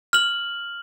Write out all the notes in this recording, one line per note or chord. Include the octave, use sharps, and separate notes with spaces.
F6 F#7